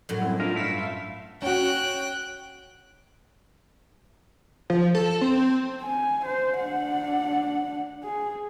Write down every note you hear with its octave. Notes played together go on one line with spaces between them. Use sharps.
F#2 A2 F#3
G3 C4 E4
A3 D4 F4 A#4 D#5 F5
G2 A3 E4 F5 B6 E7
E5 F5 C6
C#4 F#4 G5 F#6
F3
A4
C4
G#5
C5
D4 F#5
G#4